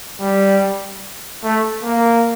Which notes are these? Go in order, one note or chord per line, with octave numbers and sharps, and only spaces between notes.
G3
A3
A#3